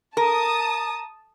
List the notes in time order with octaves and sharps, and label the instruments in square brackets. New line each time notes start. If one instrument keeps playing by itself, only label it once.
[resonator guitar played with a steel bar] A#4 [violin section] A5 D#6